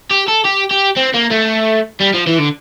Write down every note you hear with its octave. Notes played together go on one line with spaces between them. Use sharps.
G4
A4
G4
G4
C4
A#3
A3
G3
F3
E3
D3